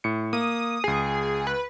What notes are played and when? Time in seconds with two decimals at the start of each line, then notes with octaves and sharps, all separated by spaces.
0.04 A2 C#7
0.33 A#3 D#6
0.84 C#2 G#4 C7
1.47 B4